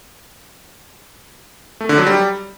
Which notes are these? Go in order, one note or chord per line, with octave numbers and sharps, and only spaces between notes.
A3
D3
F#3
G3